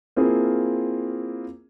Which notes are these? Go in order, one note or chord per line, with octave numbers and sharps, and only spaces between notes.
A#3 C4 E4 F4 G#4